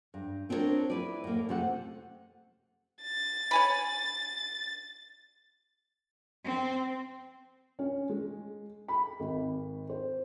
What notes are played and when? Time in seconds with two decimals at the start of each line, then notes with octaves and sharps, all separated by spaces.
0.14 G2
0.49 B3 C4 D4 E4 A#4 C#5
0.90 E4 B4 D5
1.24 A2 A#3
1.49 C3 A3 F#5
3.02 A6
3.51 C#5 G#5 B5
6.45 C4
7.79 C#4
8.09 G#3
8.88 B5
9.20 G#1
9.90 C5